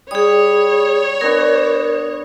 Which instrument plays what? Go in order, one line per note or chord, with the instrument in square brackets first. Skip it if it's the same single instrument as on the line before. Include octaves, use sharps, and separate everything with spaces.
[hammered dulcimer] G3 [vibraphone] G#4 D#6 [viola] C#5
[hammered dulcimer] B3 D4 F#4 [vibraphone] A#4